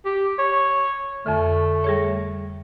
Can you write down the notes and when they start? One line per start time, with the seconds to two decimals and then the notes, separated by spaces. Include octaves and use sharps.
0.05 G4
0.39 C#5
1.26 F2 D3 A3
1.84 G3 G#4 C#5